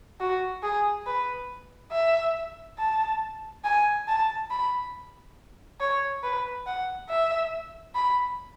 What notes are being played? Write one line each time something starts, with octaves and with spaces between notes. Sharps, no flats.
F#4
G#4
B4
E5
A5
G#5
A5
B5
C#5
B4
F#5
E5
B5